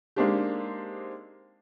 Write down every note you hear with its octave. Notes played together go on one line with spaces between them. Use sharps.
G#3 A#3 C4 D4 D#4 G4